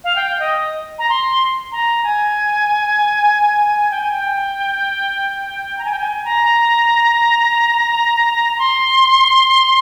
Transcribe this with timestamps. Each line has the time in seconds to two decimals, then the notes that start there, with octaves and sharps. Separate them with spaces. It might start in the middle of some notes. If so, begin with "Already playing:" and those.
0.04 F5
0.15 G5
0.39 D#5
0.98 A#5
1.09 C6
1.71 A#5
2.03 G#5
3.90 G5
4.01 G#5
4.12 G5
5.78 A#5
5.84 G#5
5.91 G5
5.99 G#5
6.24 A#5
8.59 C6